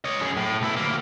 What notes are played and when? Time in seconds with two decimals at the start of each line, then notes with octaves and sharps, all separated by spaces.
0.05 C#5 D#5
0.21 F#2 G#4
0.37 A2
0.62 B1 E4
0.76 D2 A#3